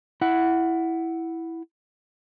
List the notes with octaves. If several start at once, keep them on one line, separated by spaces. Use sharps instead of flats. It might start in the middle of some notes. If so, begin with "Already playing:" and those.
E4 F#5